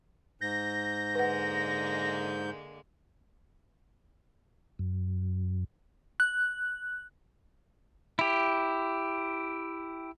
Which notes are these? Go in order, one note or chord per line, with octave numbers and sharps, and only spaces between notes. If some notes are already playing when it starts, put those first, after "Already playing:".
G#2 G6 A#6
D3 G#3 A#3 B4 F#5
F#2
F#6
E4 G4